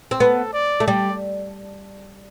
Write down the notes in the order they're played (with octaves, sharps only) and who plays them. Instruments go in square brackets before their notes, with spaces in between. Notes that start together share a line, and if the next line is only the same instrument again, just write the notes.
[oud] C4
[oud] B3 [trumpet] A4
[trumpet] D5
[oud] A3
[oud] G3 [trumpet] D5